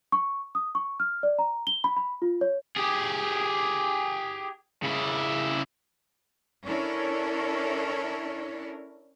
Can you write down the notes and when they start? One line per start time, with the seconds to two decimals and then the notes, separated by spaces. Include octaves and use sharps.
0.12 C#6
0.55 D#6
0.75 C#6
1.00 F6
1.23 D5
1.39 A#5
1.67 G7
1.84 B5
1.97 B5
2.22 F4
2.41 C#5
2.77 G4 G#4
4.83 C#3 E4
6.65 C#4 D4 E4 A4 A#4 C#5